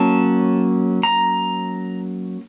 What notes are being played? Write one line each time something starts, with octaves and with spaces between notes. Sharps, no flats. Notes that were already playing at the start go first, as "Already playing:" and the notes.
Already playing: F#3 A#3 C#4 A5
A#5